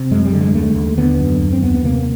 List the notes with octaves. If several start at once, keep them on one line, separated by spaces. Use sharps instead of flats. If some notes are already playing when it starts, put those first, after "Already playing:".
Already playing: C3
F#2 G#3
G3
D3
G#3
D#2 A3
D#2
D3 B3
F#2
D#2
C4
D#2 B3
B3
C3 A#3